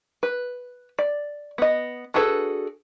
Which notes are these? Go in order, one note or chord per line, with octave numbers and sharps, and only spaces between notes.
B4
D5
B3 D#5
D4 F#4 G#4 A4 B4